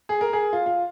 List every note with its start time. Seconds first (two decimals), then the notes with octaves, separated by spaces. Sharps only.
0.09 G#4
0.21 A#4
0.33 G#4
0.53 F4
0.66 F4